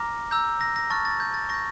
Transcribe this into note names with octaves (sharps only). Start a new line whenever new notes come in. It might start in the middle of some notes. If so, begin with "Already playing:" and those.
Already playing: A#5 D6 F6 A#6
A#5 E6 G6
A#6
A#6
A5 C#6 F6 A6
A6
G6
A6
C#6 G6 A#6